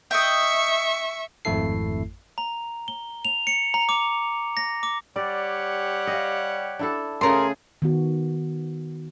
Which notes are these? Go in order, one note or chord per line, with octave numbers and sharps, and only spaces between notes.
D#5 E5 G5 C#6
G#1 F2 A3 E4 A4 C7
A#5
G7
F7
C#7
A#5
D6
A#6
D6
G3 G4 C#5 D5 F#5
D#5 F5
D4 E4 A4
C#3 A3 G#4 A#4 C6
D#3 B3 F#4